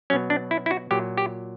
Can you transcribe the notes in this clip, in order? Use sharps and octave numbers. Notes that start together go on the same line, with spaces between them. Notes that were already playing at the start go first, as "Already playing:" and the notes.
B2 F#3 C#4
D4
E4
E4
F#4
A#2 F#3 G4
G4